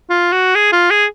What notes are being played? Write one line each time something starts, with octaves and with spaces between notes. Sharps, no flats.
F4
F#4
G#4
F4
G#4